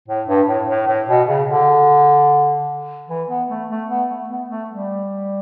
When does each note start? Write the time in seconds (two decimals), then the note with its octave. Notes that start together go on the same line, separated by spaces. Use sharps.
0.08 A2
0.28 G2
0.48 A2
0.68 A2
0.88 A2
1.09 B2
1.28 C#3
1.48 D3
3.09 E3
3.29 B3
3.49 A3
3.69 A3
3.89 B3
4.10 A3
4.29 B3
4.50 A3
4.70 G3